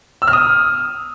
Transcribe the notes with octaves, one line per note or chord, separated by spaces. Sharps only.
E6
F6
D#6